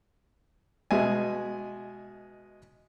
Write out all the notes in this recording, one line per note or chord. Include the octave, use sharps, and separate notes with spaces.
B2 G#3 E5 G#5